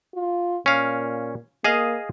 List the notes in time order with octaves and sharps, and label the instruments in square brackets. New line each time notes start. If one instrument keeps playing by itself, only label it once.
[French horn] F4
[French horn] A#2 [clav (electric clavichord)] C#4 F5
[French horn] A#3 [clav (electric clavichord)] G#4 D#5 F5